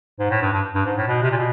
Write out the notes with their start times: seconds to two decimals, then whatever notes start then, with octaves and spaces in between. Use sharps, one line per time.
0.19 G#2
0.31 A2
0.42 G2
0.53 G2
0.75 G2
0.86 G#2
0.97 A2
1.08 B2
1.22 C3
1.32 A#2
1.37 B2